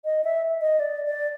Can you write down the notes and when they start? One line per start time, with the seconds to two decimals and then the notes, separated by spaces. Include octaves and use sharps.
0.05 D#5
0.24 E5
0.61 D#5
0.80 D5
1.05 D5